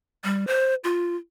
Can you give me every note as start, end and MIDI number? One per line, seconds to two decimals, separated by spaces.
0.24 0.45 55
0.47 0.75 72
0.84 1.16 65